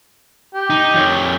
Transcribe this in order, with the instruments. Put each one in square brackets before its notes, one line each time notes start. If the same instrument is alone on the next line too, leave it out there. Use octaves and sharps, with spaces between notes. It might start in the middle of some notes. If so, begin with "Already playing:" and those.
[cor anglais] G4
[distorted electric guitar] D#4
F2 C#5